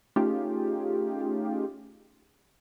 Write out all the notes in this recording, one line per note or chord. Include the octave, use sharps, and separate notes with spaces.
A3 C#4 D#4 F4 G4 G#4